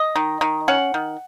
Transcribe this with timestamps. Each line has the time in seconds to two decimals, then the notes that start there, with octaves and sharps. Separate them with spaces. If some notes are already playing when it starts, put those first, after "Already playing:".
Already playing: D#5
0.16 D#3
0.41 D#3
0.68 C#4 F#5
0.94 D#3